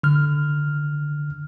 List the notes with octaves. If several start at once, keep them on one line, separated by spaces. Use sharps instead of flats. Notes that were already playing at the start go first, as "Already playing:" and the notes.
D3 F6